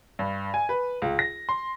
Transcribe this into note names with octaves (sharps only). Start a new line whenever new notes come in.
G2
G#5
B4
C#2
A#6
C6